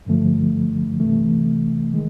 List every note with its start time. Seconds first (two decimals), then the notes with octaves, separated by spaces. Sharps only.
0.06 G2 D3 F3 A3
1.00 C3 E3 A3
1.93 D#3 G#3